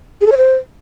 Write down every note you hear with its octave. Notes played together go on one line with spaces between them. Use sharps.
G#4
A4
C#5
C5